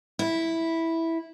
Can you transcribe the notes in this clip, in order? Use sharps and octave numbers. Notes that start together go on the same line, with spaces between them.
E4